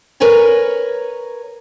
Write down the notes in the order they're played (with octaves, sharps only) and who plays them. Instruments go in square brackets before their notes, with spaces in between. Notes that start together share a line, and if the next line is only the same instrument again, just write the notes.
[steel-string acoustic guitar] A#4 B4 C#5 G#5 A#5